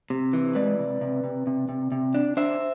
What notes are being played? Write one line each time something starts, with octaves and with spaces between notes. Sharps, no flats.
C3
E3
G#3 B4 D5
C3
C3
C3
C3
C3
C3
D4
D4 C5 E5